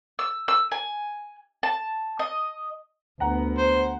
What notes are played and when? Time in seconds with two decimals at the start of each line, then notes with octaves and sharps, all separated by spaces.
0.19 E6
0.48 E6
0.72 G#5
1.63 A5
2.19 D#5
3.20 D2 B3 F#5 A#5
3.58 C5